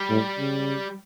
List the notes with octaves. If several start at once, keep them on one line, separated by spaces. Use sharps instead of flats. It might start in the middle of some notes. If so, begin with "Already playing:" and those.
Already playing: G3
A2
C#3